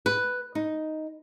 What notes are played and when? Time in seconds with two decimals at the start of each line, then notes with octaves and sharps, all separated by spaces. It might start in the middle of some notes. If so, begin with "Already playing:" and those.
0.06 B4
0.55 D#4